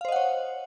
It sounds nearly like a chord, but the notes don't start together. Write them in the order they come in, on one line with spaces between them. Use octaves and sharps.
F5 C5 D#5 F#5 C#5